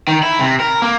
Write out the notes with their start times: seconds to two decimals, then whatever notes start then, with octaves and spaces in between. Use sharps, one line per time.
0.08 D#3
0.23 E4
0.40 C3
0.60 A#4
0.82 A#3